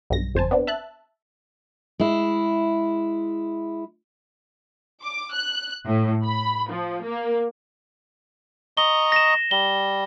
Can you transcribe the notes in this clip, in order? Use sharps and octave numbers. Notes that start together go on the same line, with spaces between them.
B1 G2 A#6
G1 F2 C5 G#5 A5
B3 C4 D4
E5 A5 F#6
G#3 E4
D6
F#6
A2
B5
F3
A#3
D#5 A#5 C#6 G7
A#6 E7
G3 G7